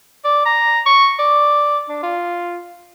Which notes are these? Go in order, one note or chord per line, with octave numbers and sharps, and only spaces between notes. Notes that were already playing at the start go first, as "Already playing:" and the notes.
D5
A#5
C#6
D5
D4
F4